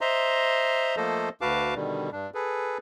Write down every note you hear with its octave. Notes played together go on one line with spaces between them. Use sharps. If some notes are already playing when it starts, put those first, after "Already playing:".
C5 D#5 E5 A#5 C6
F3 A3 A#3 A4 C5 D#5
D2 F#4 B4 F5 A5 D6
B2 D3 D#3 G3
G2 D4
G#4 A4 B4